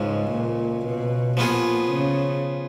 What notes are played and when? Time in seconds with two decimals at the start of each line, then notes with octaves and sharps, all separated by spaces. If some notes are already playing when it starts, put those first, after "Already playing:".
Already playing: C#2 G#2 C#3 F3
0.31 A#2
0.85 B2
1.37 A#2 F3 B3 F4 G#4
1.90 C#3